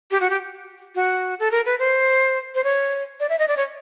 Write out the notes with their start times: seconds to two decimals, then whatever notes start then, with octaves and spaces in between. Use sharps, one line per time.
0.11 G4
0.21 F#4
0.30 G4
0.95 F#4
1.39 A4
1.51 A#4
1.66 B4
1.79 C5
2.55 C5
2.64 C#5
3.20 D5
3.29 E5
3.39 D#5
3.48 D5
3.57 C#5